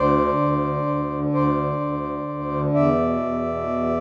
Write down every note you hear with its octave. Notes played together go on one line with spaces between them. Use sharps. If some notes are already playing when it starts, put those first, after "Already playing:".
Already playing: D2 C5 D5
D3
D2
D3
D2
D3
D2 C5 D5
D3
D2
D3
D2
D3
E2 D5 E5
B2
E2
B2
E2